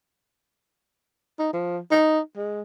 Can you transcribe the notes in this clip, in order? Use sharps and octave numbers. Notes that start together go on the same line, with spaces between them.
D#4
F3
D#4
G#3